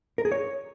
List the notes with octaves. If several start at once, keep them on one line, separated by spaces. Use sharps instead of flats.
A#4
G#4
C#5